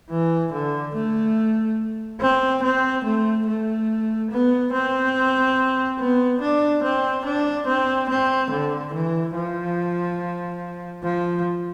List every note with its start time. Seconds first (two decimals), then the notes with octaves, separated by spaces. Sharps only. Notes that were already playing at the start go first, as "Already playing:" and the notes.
0.10 E3
0.53 D3
0.95 A3
2.21 C4
2.63 C4
3.05 A3
3.47 A3
4.31 B3
4.73 C4
6.00 B3
6.41 D4
6.83 C4
7.25 D4
7.67 C4
8.09 C4
8.51 D3
8.93 E3
9.35 F3
11.03 F3